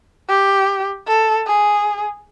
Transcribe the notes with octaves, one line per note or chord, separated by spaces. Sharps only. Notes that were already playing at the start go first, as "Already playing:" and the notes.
G4
A4
G#4